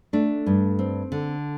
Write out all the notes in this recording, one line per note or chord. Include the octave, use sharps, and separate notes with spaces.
A3 D4
G2
C4
D3